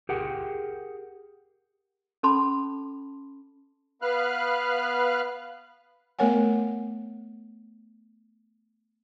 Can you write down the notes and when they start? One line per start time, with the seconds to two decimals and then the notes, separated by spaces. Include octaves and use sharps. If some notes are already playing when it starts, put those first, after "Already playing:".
0.09 G4 G#4 A#4 F#5 G5
2.23 C#4 A4 A5 B5 C6 D6
4.02 B3 B4 F5 F6 F#6
6.19 A3 B3 A#4 C#5 F#5 G#5